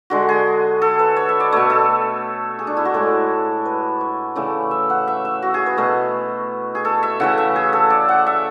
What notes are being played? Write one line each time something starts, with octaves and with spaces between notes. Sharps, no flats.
D3 G#3 F#4
G#4
A4
B4
C#5
E5
D5
B2 A3 C#5
A4
G#4
D4
E4
F#4
A2 G#3 A4
B4
C#5
C#3 E3 A3 D5
E5
F#5
E5
E5
F#4
G#4
B4
B2 A3 B4
G#4
A4
E5
C#3 E3 A3 F#5
E5
G#4
A4
D5
F#5
E5